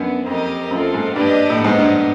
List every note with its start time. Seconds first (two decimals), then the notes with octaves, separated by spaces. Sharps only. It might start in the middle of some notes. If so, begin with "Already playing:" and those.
Already playing: F#2 B3 D4
0.26 F2 C4 D#4 G4 A#4 D#5
0.71 F#2 C4 F4 A4
0.94 G#2
1.16 G2 D4 G4 B4 D#5
1.50 A2
1.61 G#2 B3 D#4 G4 C5 D#5
1.78 G2